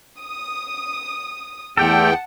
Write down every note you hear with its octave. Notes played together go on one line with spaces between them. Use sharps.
D#6
E2 A3 G4 A4 F#5 G5 A5